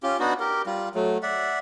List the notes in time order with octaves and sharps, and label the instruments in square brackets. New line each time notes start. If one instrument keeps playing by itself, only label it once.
[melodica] C#4 F4 G4
B3 D4 D#4 F#4
G4 A#4
G3 F4
F#3 A3
D5 E5 F#5